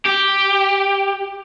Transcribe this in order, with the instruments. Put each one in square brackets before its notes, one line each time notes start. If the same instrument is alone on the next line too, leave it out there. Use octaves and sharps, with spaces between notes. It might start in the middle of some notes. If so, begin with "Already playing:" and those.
[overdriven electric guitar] G4